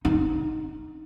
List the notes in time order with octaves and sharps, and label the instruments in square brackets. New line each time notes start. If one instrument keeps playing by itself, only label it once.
[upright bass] D#4